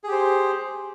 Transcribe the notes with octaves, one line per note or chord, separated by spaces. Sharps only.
G4 G#4 C5